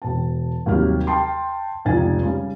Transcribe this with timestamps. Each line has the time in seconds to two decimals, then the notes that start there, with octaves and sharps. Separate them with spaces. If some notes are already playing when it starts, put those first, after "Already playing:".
0.02 E1 A5
0.66 D#2 C3 F#3 G3 G4 F6
1.07 G5 A5 C6
1.85 F1 C#2 G#2 D#4 G#5 A6
2.22 C#3 G3